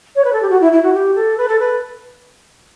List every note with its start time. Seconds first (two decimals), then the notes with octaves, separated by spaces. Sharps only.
0.15 C#5
0.24 B4
0.33 A4
0.42 G4
0.50 F#4
0.61 E4
0.72 E4
0.83 F#4
0.94 G4
1.15 A4
1.37 B4
1.48 A4
1.59 B4